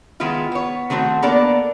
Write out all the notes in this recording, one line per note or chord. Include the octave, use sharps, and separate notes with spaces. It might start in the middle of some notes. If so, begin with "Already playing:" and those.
D#3 G#3 B3 E4 F4
B3 C#5
D#3 A3 C4 D#4 F#4
A#3 B3 D4 A4 A#4 D5